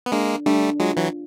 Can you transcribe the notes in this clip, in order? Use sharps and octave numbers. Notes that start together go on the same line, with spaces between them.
B3
G#3 A#3 D4
G3 A3 D4
F#3 G#3 F4
E3 F#3